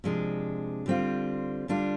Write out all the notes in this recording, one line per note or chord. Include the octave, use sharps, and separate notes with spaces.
C3 F3 G#3 D4
D3 G3 C4 F4
D3 G3 D4 F4